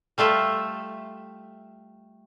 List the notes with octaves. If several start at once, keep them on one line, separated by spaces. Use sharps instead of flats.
G3 A3 F4 E5